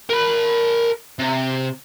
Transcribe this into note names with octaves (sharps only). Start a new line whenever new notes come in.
A#4 B5
C3